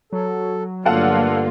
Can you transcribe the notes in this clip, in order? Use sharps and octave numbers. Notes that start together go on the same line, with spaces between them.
F#3 A4
G2 D3 A3 A#3 F4 A4 F5 F#5